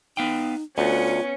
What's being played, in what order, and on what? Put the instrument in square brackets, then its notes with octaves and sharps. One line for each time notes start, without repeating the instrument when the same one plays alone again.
[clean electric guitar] B3 F5 G5 [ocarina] D#4
[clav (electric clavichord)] D2 [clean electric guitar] B3 [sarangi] C#4 [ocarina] F4